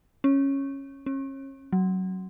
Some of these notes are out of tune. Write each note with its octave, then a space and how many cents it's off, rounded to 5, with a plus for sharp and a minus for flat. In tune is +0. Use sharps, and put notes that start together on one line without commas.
C#4 -10
C#4 -35
F#3 +15